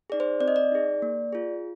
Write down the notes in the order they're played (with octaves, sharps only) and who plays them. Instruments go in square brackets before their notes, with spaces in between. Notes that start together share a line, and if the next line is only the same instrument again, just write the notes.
[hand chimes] D#4 G#4 D5
C5
C4 D5
D#5
D5
D#4 G#4
A#3
F4 G#4